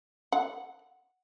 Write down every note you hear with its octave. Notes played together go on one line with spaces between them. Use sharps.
F#5